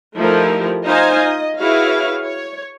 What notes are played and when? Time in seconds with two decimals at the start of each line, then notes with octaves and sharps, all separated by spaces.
0.17 F3 A3 D#4 E4 G4 A#4
0.85 D#4 F4 C5 D#5 F5 G#5
1.18 D#5
1.60 E4 F#4 G#4 B4 C#5 F5
2.24 C#5